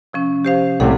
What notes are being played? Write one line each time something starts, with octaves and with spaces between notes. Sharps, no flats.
C3 F3 C#4
G4 C5 F5
C2 A2 C3 A4 F#5